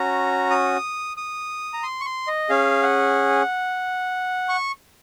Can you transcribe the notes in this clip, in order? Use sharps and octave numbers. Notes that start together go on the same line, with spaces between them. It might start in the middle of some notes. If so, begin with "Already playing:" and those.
Already playing: C#4 F#4 A#5
D#6
D#6
A#5
C6
C#6
C6
D#5
C#4 G#4 F5
F#5
C#6